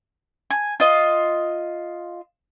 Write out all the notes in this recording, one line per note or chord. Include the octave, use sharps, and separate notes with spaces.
G#5
F4 D#5